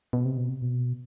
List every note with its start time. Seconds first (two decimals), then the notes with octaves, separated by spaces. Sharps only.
0.13 B2
0.25 C3
0.38 B2
0.49 C3
0.62 B2